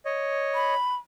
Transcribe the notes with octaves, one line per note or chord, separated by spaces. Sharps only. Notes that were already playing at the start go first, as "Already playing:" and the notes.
C#5 D#5
B5